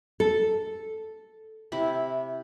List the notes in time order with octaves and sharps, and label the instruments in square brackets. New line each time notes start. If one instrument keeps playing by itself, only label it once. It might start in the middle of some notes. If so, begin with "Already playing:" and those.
[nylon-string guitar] A4
[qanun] C3 E4 B5